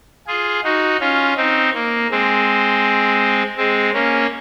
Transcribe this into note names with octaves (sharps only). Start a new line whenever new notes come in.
F4 G#4
D#4 F#4
C#4 F4
C4 D#4
A#3
G#3 C4
G#3 C4
A#3 C#4